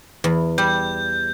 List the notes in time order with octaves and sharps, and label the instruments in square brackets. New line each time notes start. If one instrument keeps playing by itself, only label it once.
[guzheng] E2
[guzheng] G3 [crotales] G6